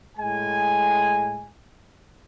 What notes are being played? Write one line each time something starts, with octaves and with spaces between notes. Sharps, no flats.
A2 G#3 G#5